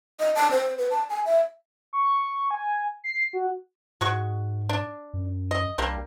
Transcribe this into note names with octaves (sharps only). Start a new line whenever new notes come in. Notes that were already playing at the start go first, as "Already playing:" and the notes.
D#5
A5
C5
B4
A5
G#5
E5
C#6
G#5
C7
F#4
G#2 G#3 F#4 C#6
D4
F#2
D#5
C2 G3 A#3 D4